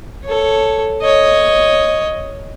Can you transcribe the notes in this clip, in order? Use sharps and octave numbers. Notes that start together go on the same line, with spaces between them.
A4 C#5
C#5 D#5